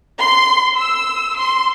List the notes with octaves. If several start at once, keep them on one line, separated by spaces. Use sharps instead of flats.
C6
E6
C6